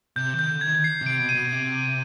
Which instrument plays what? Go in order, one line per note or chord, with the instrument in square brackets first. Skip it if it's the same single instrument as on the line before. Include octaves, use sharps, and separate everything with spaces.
[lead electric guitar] C3 [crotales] G6
[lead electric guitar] D#3
[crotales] G6
[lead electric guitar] D3
[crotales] G#6
[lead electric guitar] D#3
[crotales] C7
[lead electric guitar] C3 [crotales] D7
[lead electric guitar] B2
[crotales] D#7
[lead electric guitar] B2
C3